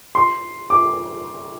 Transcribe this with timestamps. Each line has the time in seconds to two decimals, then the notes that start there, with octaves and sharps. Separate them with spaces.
0.15 C6
0.70 D6